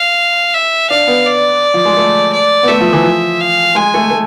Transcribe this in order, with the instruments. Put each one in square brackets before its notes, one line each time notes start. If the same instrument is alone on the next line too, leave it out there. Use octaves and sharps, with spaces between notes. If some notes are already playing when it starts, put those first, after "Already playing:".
Already playing: [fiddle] F5
E5
[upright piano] D4 [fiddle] F5
[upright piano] B3
[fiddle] D5
[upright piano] F3
G#3
A3
[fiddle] D5
[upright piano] B3
[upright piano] A3 [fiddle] E5
[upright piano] F3
E3
F3
[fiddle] F5
[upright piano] G#3 [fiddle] G#5
[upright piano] A3
A3